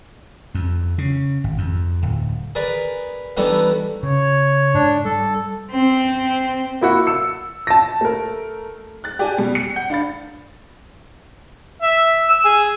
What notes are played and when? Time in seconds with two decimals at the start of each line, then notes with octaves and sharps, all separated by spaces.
0.55 F2
0.98 C#3
1.44 G#1
1.58 F2
2.03 D1
2.55 G#4 A#4 B4 D5
3.37 E3 G3 A3 B3 D4 D#4
4.03 C#3 C#5
4.75 G#2 D4
5.05 G3 A4
5.72 C4
6.81 A#3 E4 F#4
7.07 E6 C#7
7.67 A5 A#6
8.01 A3 A#4
9.04 F#6 A6
9.19 G4 D5 G#5 A5
9.38 B2 G3
9.55 C#7
9.76 F#5 G6
9.90 D4 F5 B5 A6
11.82 E5
12.29 E6
12.45 G#4